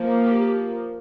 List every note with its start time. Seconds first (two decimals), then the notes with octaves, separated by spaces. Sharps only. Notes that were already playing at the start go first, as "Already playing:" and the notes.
Already playing: F3 A#3
0.23 G4